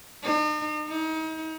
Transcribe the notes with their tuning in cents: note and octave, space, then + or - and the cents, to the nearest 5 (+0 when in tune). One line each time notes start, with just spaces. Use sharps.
D#4 -45
D#4 +35